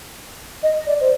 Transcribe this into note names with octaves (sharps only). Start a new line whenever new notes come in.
D#5
D5
C5